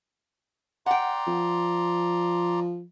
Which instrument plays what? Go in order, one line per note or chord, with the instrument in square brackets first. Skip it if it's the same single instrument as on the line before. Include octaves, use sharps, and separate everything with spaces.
[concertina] D5 A#5 C6 [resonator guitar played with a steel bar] F#5 G5
[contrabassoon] F3